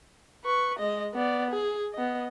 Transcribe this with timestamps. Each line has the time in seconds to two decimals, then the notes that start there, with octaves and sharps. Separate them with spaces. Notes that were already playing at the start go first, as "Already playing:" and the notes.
0.44 B4 C#6
0.79 G#3 D#5
1.14 B3 D5
1.51 G#4
1.94 B3 D#5